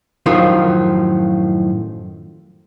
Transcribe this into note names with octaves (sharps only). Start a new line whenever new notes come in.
F#2 A2 D#3 F3